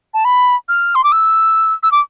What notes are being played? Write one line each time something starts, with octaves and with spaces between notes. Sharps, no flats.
A5
B5
F6
C6
D6
E6
E6
D6